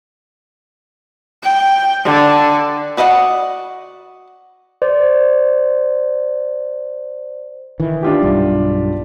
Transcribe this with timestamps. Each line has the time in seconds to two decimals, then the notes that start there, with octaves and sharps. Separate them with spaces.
1.43 G5
2.05 D3
2.97 F#4 D5 D#5 F5 F#5
4.82 C5 D5
7.80 D#3 E3
8.03 D4 F4 G4
8.22 B1 G2 G3